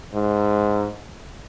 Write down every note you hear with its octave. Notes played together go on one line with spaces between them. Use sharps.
G#2